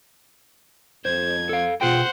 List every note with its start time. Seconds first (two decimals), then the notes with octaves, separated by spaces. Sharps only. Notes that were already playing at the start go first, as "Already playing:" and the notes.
1.05 F2 C5 G#6
1.49 A4 F5
1.81 B2 F4 G#4 C5 F#5 G5